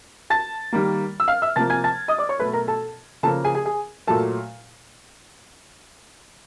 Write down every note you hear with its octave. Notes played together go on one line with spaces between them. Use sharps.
A5 A6
D#3 G3 A#3
E6
F5 F6
E5 E6
C3 F3 A#3 A5 A6
G#5 G#6
A5 A6
D#5 D#6
D5 D6
C#5 C#6
B2 F#3 A3 B4 B5
A#4 A#5
A4 A5
C#3 F3 A#3 A4 A5
G#4 G#5
G#4 G#5
G#4 G#5
A#2 F#3 A3 A4 A5